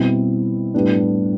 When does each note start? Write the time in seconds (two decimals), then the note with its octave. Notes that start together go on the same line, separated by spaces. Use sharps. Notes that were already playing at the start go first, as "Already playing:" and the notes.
Already playing: B2 G3 C4 E4
0.74 A2 G3 B3 D4